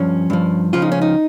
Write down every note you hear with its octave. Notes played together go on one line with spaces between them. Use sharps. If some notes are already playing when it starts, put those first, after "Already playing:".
Already playing: G2 F3 C#4
G2 F3
C#2 C#3 F3 F4
D#4
C#4
D#4